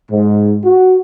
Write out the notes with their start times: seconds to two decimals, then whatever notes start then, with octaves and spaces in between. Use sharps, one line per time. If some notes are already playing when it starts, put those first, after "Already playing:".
0.10 G#2
0.64 F#4